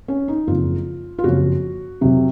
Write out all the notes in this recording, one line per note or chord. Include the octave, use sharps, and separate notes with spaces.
C#4
D#4
F#1 F2 C#3 F3 F4
F4
F#1 F2 C#3 F3 F#4
F1 F2 C3 F#3